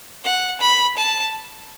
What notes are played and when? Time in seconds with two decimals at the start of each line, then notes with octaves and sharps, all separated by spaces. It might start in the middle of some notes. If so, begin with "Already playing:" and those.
0.24 F#5
0.61 B5
0.97 A5